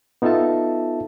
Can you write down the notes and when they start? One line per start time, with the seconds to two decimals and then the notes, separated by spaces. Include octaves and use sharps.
0.22 B3 D#4 F4 A4 E5 A5